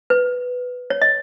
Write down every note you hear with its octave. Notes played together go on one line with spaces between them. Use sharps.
B4
C#5
D#5